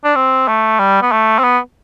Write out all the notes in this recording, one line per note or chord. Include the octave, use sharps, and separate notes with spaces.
D4
C4
A3
G3
B3
A3
C4
B3